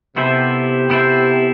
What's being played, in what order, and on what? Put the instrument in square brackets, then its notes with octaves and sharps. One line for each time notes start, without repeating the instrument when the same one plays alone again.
[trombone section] C3 [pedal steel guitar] B3 E4 A4 C5 E5
[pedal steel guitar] B3 E4 A4 C5 E5